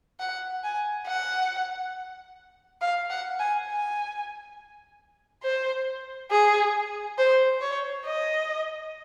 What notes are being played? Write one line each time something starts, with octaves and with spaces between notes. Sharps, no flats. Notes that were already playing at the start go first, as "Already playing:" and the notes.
F#5
G#5
F#5
F5
F#5
G#5
G#5
C5
G#4
C5
C#5
D#5